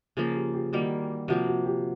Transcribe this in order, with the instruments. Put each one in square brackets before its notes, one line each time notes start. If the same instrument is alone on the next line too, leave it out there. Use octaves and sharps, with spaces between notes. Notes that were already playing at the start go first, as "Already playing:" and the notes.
[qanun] C#3 F3 A#3 [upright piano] G#4
[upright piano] G4
G4
[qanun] D#3 G3 A#3 [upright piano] F#4
[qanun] C3 F3 A#3 [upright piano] F#4
[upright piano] F#4
G4